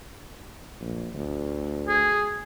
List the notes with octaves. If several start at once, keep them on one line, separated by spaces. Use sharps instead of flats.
A#1
D2
G#4